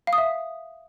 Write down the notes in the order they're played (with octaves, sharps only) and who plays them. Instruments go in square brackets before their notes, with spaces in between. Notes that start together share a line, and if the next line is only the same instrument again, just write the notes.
[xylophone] F5
D#6
E5